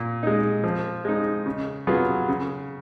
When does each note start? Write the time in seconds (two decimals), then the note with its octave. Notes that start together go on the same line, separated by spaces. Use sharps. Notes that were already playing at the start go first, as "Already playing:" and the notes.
Already playing: A#2
0.23 G#3 D#4
0.64 F3
1.05 G#3 D#4
1.46 C#3
1.87 F#3 B3 F4 G#4
2.28 C#3